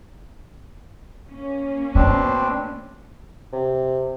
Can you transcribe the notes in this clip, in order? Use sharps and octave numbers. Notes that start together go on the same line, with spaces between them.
A#3 C#4
B2 A3 C4 D4
C3